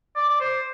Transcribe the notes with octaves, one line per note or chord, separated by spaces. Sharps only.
D5
D5
C5